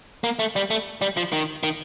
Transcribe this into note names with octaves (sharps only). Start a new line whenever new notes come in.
A#3
A3
G3
A3
G3
F3
D#3
D#3